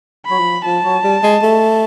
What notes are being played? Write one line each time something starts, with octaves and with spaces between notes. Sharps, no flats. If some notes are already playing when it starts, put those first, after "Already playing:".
F#3 B5
F3
F3 A5
F#3
G3
G#3
A3